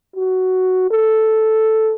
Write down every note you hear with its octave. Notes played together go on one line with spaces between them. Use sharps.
F#4
A4